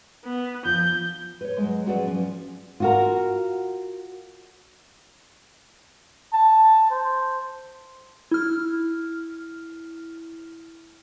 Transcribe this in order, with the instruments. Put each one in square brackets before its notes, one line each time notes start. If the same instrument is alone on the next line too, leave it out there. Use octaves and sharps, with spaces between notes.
[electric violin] B3
[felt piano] F3 [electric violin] G6
[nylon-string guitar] B4 C#5
F#3 G#3
F3 F#3 C#4 G#4 B4 D5
F3 C#4
F4 F#4 A#4
[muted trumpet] A5
C5
[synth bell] E4 F6